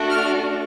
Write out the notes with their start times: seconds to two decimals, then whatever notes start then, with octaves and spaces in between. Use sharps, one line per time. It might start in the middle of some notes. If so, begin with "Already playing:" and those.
Already playing: A3 D4 F#4 A4
0.11 F6